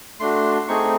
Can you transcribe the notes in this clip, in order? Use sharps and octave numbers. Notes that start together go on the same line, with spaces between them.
A3 D4 F#4 C6
A3 C4 D#4 G#4 C#6